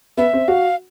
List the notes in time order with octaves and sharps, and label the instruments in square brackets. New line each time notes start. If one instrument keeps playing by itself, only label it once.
[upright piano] B3 [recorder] E5
[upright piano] C4
[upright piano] F#4 [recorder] F5